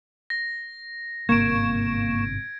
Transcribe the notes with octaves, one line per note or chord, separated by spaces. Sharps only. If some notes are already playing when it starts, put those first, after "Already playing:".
A#6
G1 G#2 C3 A#3 C#6 G#6 D7 E7